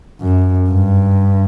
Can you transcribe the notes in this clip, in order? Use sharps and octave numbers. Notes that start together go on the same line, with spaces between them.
F#2
G2